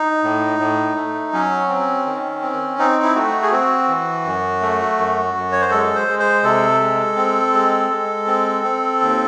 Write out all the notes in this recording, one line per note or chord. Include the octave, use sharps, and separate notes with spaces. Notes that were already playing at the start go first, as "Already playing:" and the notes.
Already playing: D#4
A2
A2
A3
F#3 C#4
C4
D#3
C4
C4 D#4
E4
A3 F#4
G#4
C4 F#4
E3
F#2
A3
F#2
F#2
C#5
C5
G#3 A4
C5
G#3
C5
C3 A4
G#3
C4
G#3
G#3
C4
C4
D#2